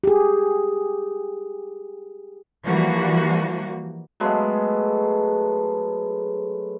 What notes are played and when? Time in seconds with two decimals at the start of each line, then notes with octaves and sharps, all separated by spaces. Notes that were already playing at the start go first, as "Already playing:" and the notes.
0.04 G4 G#4
2.64 E3 F3 G3 A#3 F#4
4.20 F#3 G#3 A3 B3